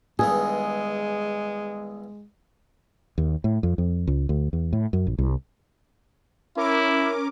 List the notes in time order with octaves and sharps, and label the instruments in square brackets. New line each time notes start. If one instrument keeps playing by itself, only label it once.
[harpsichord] E2 G2 D#3 [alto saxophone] G#3 [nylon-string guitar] G#4
[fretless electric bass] D#2
A2
F2
F2
C#2
D2
E2
A2
F#2
A#1
C2
[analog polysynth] C#4 A#4 D6 [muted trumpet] E4